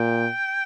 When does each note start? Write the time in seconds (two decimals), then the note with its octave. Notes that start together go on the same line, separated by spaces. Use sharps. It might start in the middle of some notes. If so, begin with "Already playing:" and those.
Already playing: A#2 G5